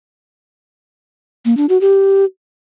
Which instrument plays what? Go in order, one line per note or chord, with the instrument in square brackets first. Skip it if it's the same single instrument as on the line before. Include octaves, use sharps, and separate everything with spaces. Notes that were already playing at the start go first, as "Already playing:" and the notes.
[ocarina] A#3
D4
F#4
G4